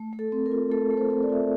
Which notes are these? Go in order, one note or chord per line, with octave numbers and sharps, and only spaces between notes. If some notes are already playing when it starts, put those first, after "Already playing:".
Already playing: A3
A3
A4
C4
A#4
F4
A3 A4
A3
C5
C4
D5
F4 E5